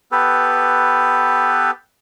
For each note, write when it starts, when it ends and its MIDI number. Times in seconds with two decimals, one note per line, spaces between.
0.12 1.71 59
0.12 1.71 67
0.12 1.71 69
0.12 1.71 71